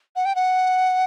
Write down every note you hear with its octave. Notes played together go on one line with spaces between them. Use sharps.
F#5
G5
F#5